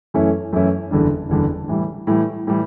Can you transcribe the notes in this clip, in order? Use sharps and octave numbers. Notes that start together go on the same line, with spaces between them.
F#2 E3 A3 C#4 E4
F#2 E3 A3 C#4 E4
F#1 E2 D3 G3 D4
F#1 E2 D3 G3 D4
A2 E3 G3
A2 E3 G3
A2 E3 G3